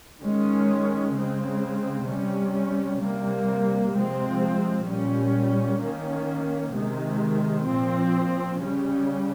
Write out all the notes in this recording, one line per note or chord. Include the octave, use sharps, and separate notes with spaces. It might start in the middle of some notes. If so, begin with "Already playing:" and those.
D#3 G#3 C#4
C#3 G#3 C4
C3 G3 C#4
C3 G3 A#3
C3 F3 G#3 C4
A#2 G3 C#4
D#3 A#3 C#4
C3 D#3 G#3
A#2 F3 C4
C#3 G3 C#4